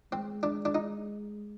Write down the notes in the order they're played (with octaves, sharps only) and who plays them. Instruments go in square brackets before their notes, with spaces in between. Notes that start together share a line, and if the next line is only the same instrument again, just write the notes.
[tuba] G#3 [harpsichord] C4
[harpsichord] D4
D4
D#4